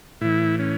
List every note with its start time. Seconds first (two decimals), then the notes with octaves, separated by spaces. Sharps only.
0.21 A2 E3 E4
0.59 C#4